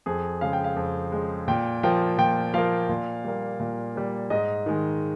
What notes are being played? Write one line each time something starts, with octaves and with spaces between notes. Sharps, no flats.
F2 G#4
C#3 G#3 F5
G5
F5
F2
C#3 G#3
A#2 G5
F3 A#3 G5
A#2 G5
F3 A#3 F5
A#2
G3 A#3
A#2
G3 A#3
G#2 D#5
D#3 G#3